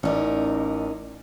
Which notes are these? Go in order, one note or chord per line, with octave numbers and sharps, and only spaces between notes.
A1 C#4 D#4 A#4 D5